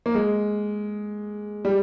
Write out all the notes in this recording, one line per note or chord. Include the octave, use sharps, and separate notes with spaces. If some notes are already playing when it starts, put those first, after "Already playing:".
A#3
G#3
G3